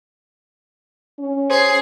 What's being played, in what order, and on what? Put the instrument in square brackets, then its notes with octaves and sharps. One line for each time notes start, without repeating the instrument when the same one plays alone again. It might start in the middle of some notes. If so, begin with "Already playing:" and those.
[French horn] C#4
[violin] G#4 C7 [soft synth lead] C5